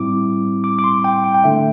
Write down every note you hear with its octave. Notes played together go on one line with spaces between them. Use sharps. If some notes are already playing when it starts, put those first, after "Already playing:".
Already playing: A2 G3 C4 E4 D6
D6
D6
C6
G5
G5
G5
D3 A3 D4 E5